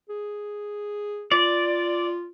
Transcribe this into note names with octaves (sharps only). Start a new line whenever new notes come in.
G#4
F4 D5